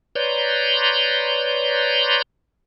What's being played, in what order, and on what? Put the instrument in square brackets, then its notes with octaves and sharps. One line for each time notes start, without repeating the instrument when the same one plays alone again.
[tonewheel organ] B4 C#5 D5 A#5 C6 G6